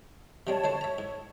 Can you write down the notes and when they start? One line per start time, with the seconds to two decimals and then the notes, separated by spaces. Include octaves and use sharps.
0.47 C3 G3 G#3 C#5 A5
0.64 D2 G#3 C5
0.81 C#5 E5 A#5
0.98 G#2